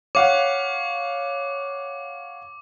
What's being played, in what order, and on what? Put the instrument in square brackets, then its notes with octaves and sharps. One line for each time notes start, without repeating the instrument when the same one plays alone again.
[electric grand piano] C#5 F5 F#5 [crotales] D6